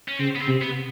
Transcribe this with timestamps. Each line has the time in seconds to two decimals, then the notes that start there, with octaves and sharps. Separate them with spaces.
0.08 C#4
0.19 C#3 C4
0.36 B3
0.41 C4
0.47 C3
0.62 B3